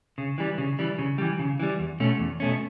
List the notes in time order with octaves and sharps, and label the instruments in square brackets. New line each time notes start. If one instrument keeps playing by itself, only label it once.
[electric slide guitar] C#3
E3 G3
C#3
E3 G3
C#3
E3 G3
C#3
E3 G3
E2
B2 A3 C#4
E2
B2 A3 C#4